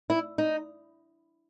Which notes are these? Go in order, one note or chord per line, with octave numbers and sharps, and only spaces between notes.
E4
D#4